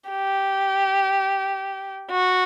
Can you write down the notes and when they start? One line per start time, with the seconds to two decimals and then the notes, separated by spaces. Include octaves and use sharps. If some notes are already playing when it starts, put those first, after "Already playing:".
0.09 G4
2.11 F#4